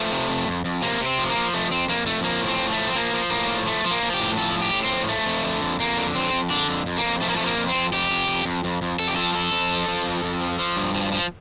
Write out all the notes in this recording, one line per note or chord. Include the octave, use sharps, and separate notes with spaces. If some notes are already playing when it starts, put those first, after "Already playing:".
Already playing: F3 A3
C3
F2
F2
F2
C3 A#3
C3
C4
F3
A#3
F3
F2 A3
F2 C4
F2 A#3
F2 A3
F3 A#3
A2
C4
F3
A3
F3
C4
F3 A#3
F3
A2 A#3
F3
F3 A3
F3
A#3
F3
G4
A2
F3 A4
A2
G4
A2
C4
F3
F3 A3
F2
D3
F2
F2 A#3
D3
F2 C4
F2
D3 D4
F2
F2
A#3
F2
F3 A3
A#3
A3
F2
A#3
F2
C4
F2
F2 G4
F2
F2
F2
F2
F2
F2 A4
G4
F3 A4
F2 A4
F2
F3
F3
F2
F2
F3
F3
G2
F3
F3